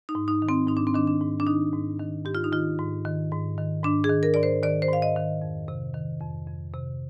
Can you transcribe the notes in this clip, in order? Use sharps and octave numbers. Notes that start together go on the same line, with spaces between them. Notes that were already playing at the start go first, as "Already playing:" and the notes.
D#4
G#2
D#4
D#3
C4
G#2 D#4
D4
C4
D#3 D4
D4
G#2
D4
D#3 D#4
G#2
D#3
G#2 G4
F4
D#4
D#3 F4
G#2
D#3
G#2
D#3
G#2 D4
G#4
D#3
A#4
G#2 D5
C5
D#3 D5
C5
G#2 F5
D#5
D#3
F2
C3
D#3
F2
F2
C3